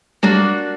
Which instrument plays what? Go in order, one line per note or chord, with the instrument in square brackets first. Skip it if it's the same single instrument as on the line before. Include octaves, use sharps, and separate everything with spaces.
[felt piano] G3 [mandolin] A#3 D4 F#4